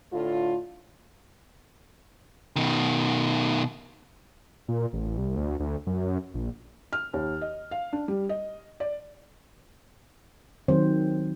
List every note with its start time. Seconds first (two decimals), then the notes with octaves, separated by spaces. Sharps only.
0.12 A2 D3 F4
2.56 B2 D#3
4.68 A#2
4.93 A1
5.17 C2
5.36 D2
5.60 D2
5.87 F#2
6.34 A#1
6.93 F6
7.13 D#2
7.41 D#5
7.71 F5
7.93 D4
8.08 G3
8.29 D#5
8.80 D5
10.68 D#3 F#3 C4 C5